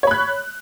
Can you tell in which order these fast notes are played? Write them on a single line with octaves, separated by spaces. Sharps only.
C#5 B5 F#6